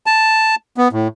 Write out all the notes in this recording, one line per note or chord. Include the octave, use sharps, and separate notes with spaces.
A5
B3
A2